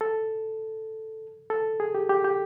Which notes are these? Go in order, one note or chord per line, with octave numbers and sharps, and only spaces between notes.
A4
A4
G#4
G4
G4
G4